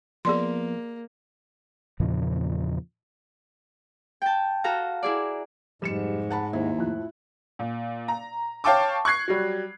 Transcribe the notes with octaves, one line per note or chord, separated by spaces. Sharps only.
F3 A#3 B3 G#4 D5 C6
E2 A#2 C#3 F3
G5 A5
F#4 A4 F5 A#5
E4 G#4 D5
F1 G#2 G3 C#7 E7
F#5 A5 B5
D#2 E4 C5
F2 A2 F#6
A#2
A#5
C#5 F5 G5 A5 C#6 D6
C#6 F#6 G#6 C7
F#3 G3